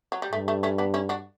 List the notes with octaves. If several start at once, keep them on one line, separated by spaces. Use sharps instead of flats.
F#3
G3
G2 A3
A3
A3 C#4
B3 D4
C#4 E4
D4 F#4